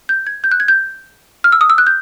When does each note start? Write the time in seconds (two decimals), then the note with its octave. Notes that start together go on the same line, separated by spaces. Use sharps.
0.09 G6
0.27 G#6
0.44 G6
0.51 F#6
0.60 G#6
0.68 G6
1.44 F6
1.52 E6
1.61 D#6
1.70 E6
1.78 F#6
1.87 G6